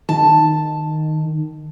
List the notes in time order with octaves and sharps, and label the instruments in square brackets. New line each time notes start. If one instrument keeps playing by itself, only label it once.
[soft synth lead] D#3 [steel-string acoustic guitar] A5